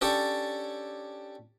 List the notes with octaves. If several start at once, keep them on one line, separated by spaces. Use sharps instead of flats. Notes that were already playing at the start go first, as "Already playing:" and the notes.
C#4 D4 G4 A4 C#5 D5